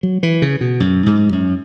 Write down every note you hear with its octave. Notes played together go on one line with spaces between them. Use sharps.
F#3
E3
C#3
B2
F#2
G#2
F#2